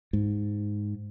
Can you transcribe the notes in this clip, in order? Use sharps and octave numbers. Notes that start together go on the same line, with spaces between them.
G#2